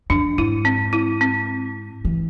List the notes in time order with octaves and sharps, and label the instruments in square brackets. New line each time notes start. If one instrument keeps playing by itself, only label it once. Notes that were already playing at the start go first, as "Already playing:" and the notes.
[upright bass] F2 [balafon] D4
[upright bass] G#2 [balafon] E4
[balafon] C4
E4
C4
[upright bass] E3